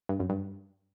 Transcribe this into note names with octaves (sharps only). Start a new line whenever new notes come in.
G2
F#2
G2